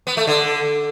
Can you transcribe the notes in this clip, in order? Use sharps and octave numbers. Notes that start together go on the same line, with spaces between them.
B3
A3
D3